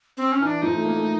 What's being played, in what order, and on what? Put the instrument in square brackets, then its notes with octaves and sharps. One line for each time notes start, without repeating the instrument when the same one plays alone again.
[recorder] C4
C#4
[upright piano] E3 [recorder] D#4
[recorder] D4
[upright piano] F3 [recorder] D#4
[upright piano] A3
A#3
A3